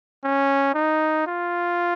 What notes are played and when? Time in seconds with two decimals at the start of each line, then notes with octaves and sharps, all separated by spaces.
0.24 C#4
0.74 D#4
1.26 F4